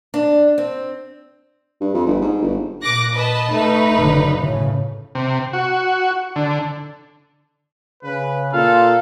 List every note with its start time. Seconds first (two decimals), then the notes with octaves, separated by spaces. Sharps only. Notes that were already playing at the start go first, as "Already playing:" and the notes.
0.14 D4
0.58 C4
1.81 G2
1.94 F2
2.06 G1
2.21 G#2
2.42 G1
2.82 A#2 D6 F#6 A#6
3.13 B4 D#5 A5
3.49 A3 D#4 B4
3.98 F#1 D3
4.41 A2 C#3
5.15 C3
5.53 F#4
6.36 D3
8.03 C#3 B4
8.53 A#2 F4 A4 F5